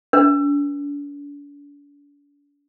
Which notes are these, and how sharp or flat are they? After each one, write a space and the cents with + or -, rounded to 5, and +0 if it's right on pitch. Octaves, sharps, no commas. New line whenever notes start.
D4 -40 B4 -35